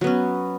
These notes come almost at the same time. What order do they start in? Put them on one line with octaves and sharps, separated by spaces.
F#3 B3 C#4